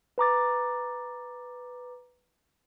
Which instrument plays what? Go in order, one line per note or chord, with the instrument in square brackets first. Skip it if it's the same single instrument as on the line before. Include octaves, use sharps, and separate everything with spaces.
[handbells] B4 A#5 D6 A6